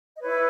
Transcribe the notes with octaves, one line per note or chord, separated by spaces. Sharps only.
D#5
E4 B4 C#5